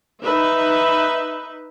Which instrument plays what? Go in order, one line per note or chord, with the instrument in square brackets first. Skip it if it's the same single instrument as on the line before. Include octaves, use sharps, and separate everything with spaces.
[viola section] D#4 B4 E5